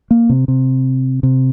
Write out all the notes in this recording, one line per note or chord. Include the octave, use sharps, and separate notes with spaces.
A#3
C3
C3
C3